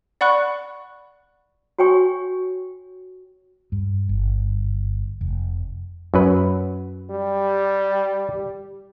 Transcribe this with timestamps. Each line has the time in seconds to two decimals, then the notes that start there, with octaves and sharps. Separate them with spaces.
0.21 D5 F#5 B5 C#6 F#6
1.78 F#4 C#5 G5 G#5 C#6
3.72 G2
4.09 G1
5.21 F1
6.14 F#2 F#3 B4
7.10 G3